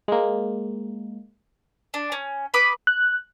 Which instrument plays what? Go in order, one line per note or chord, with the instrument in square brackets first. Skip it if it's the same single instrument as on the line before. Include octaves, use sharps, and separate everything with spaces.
[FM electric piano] G#3 A#3
[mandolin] D4
C#4
B4 B5 D6 D#6
[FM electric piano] F#6